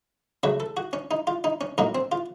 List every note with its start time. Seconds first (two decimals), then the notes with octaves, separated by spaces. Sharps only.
0.43 C#3 F#3 A3 F#4
0.60 A4
0.77 F#4
0.93 C#4
1.11 D#4
1.27 F4
1.44 D#4
1.61 C#4
1.78 A2 F#3 A#3 D#4
1.95 C4
2.12 F4